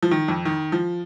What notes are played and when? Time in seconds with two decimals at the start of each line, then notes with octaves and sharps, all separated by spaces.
0.03 F3
0.11 D#3
0.28 F2
0.45 D#3
0.72 F3